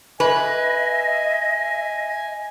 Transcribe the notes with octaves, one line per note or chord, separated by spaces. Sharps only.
B4 D#5 E5 G#5